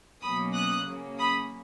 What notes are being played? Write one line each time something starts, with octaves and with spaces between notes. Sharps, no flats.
B2 F#3 A#3 C#4 B5 D#6
D#6 F#6
C#3 F#3 A#3 C#4
B5 D#6